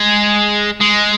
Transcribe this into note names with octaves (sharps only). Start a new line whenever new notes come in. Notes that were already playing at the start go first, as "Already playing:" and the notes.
Already playing: G#3
G#3